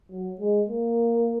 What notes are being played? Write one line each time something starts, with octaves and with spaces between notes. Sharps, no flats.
F#3
G#3
A#3